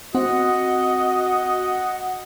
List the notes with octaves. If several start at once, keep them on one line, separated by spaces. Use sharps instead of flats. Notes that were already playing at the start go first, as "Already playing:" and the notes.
C4 F#4 D#5 F#5